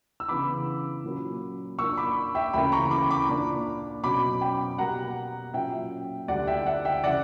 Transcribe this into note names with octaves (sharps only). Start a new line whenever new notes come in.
E6
C#3 E3 B3 D4 B5 D6
A#2 F#3 A#3 C#4
A#2 A#3 D4 C#6 E6
B5 D6
E5 G5
D2 C#3 E3 A#3 C#4 G5 B5
A#5 C#6
B5 D6
B5 D6
A#2 A#3 D4
B2 F#3 C#4 B5 D6
G5 B5
B2 G3 A#3 F#5 A#5
A#2 F#3 A#3 C#4 E5 G5
D2 D3 G3 D5 F#5
E5 G5
D5 F#5
E5 G5
C#3 E3 D5 F#5